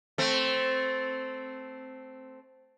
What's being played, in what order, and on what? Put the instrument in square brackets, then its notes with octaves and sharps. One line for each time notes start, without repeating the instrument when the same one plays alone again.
[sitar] A3 C4